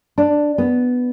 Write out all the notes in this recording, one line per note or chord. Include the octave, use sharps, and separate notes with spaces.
D4
B3